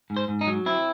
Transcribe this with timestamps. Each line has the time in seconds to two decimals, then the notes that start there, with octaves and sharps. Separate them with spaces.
0.10 G#2
0.17 C5
0.28 G#2
0.41 D#4
0.47 F#3
0.66 C4 E4